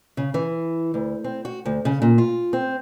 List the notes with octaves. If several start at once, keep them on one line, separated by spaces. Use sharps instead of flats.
C#3
E3
D2
C4
F#4
D2
C#3
A#2
F4
C4